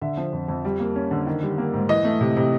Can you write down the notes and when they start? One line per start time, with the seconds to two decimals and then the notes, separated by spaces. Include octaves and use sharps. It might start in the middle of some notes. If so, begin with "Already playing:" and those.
0.01 D3 E5
0.17 F3
0.33 F2
0.48 F2
0.65 G3
0.80 A#3
0.95 C#4
1.11 D3
1.27 D#3
1.43 G3
1.58 A#3
1.73 G#2
1.89 E3 D#5
2.05 A3
2.21 C3
2.37 C3